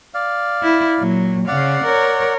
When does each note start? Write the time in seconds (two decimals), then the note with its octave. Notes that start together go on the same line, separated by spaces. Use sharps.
0.14 D5 F5
0.63 E4
0.99 A#2 F#3
1.48 C#3 D5 F5 F#5
1.84 A#4 C#5